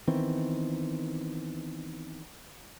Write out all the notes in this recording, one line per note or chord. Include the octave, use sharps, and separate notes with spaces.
D#3 E3 B3 C4